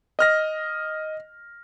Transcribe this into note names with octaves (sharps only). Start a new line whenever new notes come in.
D#5 F6 A#6